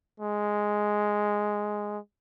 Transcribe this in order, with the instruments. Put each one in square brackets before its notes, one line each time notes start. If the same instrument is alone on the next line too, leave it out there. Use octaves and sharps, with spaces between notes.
[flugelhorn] G#3